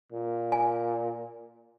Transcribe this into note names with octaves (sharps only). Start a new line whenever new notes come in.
A#2
G#5